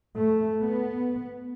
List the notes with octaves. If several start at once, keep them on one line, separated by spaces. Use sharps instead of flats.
A3
B3